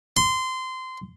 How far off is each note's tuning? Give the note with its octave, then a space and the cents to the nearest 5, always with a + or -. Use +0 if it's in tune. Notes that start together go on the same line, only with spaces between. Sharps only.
C6 -20